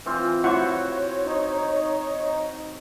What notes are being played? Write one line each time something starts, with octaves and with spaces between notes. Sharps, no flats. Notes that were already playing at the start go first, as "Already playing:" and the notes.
E3 C4 F4
E4 F#4 C5 C#5 F#5 C#6
D#4